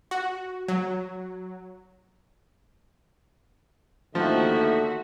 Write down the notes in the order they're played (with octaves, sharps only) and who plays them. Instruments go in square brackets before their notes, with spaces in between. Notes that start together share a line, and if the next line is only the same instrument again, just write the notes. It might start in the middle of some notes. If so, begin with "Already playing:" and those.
[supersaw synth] F#4
F#3
[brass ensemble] D#2 D3 D#3 [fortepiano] F3 [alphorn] A3 [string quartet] F#4 E5